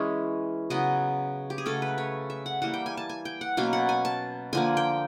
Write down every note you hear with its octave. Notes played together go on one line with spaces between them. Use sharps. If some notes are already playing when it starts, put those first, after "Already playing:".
Already playing: E3 G#3 C#4
C#3 F#3 B3 D#5
G4
G#4
C#3 F#3 A3 C#4 A4
B4
C#5
E5
F#5
E3 G3 A#3 F#5
G5
G#5
A5
G#5
G5
F#5
B2 F#3 A#3 C#4 F5
F#5
G#5
A5
D3 F3 A#3 G#5
G5